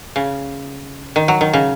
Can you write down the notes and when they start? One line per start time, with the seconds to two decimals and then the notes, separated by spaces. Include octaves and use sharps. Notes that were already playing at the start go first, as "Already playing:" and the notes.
0.16 C#3
1.16 D#3
1.28 F#3
1.41 D#3
1.53 C#3